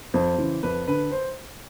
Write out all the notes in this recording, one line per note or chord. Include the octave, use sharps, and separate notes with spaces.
F2 C5
C#3 E3
F2 B4
D3 B4
C5